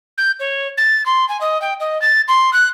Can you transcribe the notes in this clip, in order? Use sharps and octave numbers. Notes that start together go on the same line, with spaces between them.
G6
C#5
A6
C6
G#5
D#5
G5
D#5
A6
C6
F#6